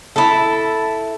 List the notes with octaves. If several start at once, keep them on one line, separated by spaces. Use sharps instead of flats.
E4 A4